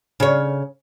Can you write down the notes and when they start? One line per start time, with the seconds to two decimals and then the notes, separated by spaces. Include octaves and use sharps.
0.20 C#3 C#5